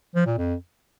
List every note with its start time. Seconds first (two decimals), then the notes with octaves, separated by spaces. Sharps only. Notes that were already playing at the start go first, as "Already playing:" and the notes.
0.15 F3
0.26 A#2
0.38 F2